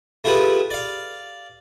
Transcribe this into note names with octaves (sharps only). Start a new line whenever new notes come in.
A3 E4 F4 G4 G#4 B4
D5 F5